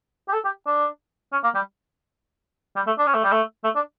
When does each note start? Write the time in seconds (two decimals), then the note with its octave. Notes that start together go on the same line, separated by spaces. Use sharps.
0.28 G4
0.33 A4
0.45 G4
0.66 D4
1.32 C#4
1.44 A#3
1.54 G3
2.76 G3
2.87 A3
2.98 D4
3.07 C#4
3.14 A3
3.24 G3
3.32 A3
3.64 A3
3.75 D4